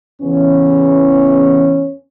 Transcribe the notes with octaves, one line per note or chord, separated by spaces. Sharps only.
E2 C#3 E3 B3 C#4